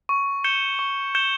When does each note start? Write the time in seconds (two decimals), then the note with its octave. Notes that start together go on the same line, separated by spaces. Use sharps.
0.09 C#6
0.44 G6 C#7 E7 G7
0.79 C#6
1.15 G6 C#7 E7 G7